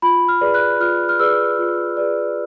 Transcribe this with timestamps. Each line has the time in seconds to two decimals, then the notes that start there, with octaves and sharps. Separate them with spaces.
0.02 F4 B5
0.28 F6
0.41 G#4 B4 D5
0.54 F#6
0.80 F4 F6
1.09 F6
1.19 G#4 B4 D5 E6
1.59 F4
1.97 G#4 B4 D5